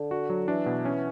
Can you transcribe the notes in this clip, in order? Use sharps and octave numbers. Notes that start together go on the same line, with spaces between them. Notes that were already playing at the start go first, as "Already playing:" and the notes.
Already playing: D3
F#4
F#3
E3 D4
B2
C#4